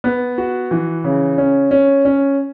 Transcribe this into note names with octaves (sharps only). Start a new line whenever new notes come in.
B3
F#4
E3
C#3
C#4
C#4
C#4